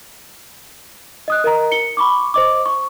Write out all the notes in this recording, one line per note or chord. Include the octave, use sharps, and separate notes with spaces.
D#5 D#6 F#6
A#4 D#5 A#5
C#7 G7
B5 C#6 D6
C5 D#5 D6
C#6